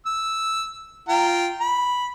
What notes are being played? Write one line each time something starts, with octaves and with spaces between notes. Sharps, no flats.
E6
F4 G5 A#5
B5